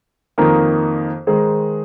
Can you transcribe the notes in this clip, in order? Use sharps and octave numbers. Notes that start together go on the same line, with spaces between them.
F2 D#3 A#3 D#4 A#4
D#3 G#3 D#4 G#4 C5